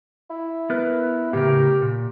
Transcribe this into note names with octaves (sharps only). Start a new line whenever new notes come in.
E4
B3 A#4 B4
A2 C#3 G4 A#4
A#2